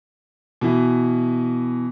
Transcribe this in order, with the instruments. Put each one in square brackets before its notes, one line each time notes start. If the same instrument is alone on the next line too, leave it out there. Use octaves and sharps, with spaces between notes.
[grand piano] B2 E3